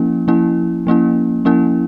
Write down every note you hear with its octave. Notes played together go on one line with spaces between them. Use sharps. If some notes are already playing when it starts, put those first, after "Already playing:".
Already playing: F3 A#3 C#4 E4
F3 A#3 C#4 E4
F3 A#3 C#4 E4
F3 A#3 C#4 E4